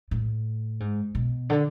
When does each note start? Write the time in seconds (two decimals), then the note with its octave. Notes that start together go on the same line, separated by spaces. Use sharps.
0.11 A2
0.80 G#2
1.15 B2
1.50 D3